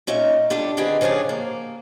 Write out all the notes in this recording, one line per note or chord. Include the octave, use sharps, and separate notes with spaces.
A#2 C#4 D#4 E5 F5
G3 D4 F4 G4 A4
D3 D#3 C4 G4 G#4 B4
C#3 F3 C#4 D4 G#4
A#3